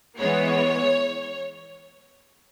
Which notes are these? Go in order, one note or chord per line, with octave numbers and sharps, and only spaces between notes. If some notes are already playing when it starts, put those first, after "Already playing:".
E3 G#3 B3 C#5